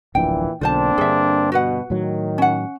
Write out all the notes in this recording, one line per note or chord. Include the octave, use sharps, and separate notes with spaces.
D1 A#1 A#2 E3 D4 G5
B1 D3 A#3 C4 D4 F4 C5 A5
G2 D3 G#4 E5
B2 F#4 B4 F#5
A2 D#3 F#3
C#4 F#5